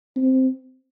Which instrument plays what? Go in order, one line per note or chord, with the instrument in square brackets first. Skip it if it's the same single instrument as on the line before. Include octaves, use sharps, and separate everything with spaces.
[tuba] C4